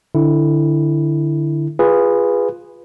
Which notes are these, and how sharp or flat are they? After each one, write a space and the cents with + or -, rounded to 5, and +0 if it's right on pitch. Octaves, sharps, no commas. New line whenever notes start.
D3 +10 E4 +0
F4 +5 G#4 -20 B4 +0